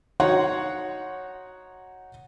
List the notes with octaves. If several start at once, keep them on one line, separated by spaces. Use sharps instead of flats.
D#4 F#4 C#5 F#5 C6